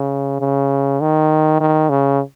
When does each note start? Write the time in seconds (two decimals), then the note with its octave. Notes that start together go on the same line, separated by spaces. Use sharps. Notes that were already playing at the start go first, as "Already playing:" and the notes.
Already playing: C#3
0.41 C#3
1.01 D#3
1.60 D#3
1.89 C#3